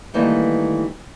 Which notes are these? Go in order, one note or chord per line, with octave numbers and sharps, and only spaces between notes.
D#3 E3 G3 A3 A#3